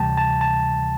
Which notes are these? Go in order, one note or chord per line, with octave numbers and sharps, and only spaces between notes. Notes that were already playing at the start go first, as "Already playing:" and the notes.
Already playing: D2 C3 E3 G3 G5 A5
A5
A5